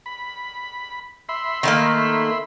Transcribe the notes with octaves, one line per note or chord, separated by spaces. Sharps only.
B5
E5 B5 C6
D#3 A3 A#3